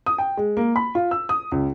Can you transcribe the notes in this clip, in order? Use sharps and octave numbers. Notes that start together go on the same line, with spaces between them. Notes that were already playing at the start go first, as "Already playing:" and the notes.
D#6
G5
G#3
A#3
B5
F4
E6
D#6
C#2